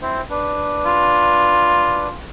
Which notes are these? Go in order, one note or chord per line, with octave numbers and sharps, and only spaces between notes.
C4 E4 C5
D4 B4
F4